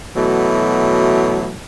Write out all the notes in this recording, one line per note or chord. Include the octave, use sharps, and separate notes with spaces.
B2 E3 F#3 A3